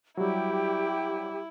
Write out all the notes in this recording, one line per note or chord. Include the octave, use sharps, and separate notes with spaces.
F#3 G3 E4 G4